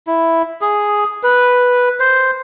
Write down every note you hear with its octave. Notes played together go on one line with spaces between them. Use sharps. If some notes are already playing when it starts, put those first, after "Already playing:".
E4
G#4
B4
C5